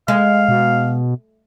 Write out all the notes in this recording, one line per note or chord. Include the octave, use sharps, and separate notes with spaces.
G#3 F5
B2